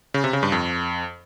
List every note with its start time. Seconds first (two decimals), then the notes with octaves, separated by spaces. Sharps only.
0.14 C#3
0.24 C3
0.33 C#3
0.43 G2
0.52 F2